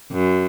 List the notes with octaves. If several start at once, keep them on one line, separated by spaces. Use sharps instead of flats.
F#2